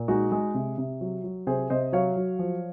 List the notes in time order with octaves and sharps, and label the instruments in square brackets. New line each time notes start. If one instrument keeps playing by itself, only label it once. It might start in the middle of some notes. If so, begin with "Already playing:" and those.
Already playing: [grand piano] A#2
G#3 D#4 F#4
G#3
C3
C3
F#3
F#3
C3 G#4 C5
C3 C5 D#5
F#3 C#5 F5
F#3
F3